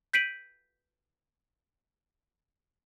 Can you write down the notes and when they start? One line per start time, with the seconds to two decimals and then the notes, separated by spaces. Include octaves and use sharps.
0.13 G6 B6 C7 D7 D#7 F#7